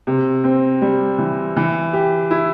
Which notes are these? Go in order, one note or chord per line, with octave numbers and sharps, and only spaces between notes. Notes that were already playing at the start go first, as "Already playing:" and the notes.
C3
C4
G3
E3
E3
G4
E4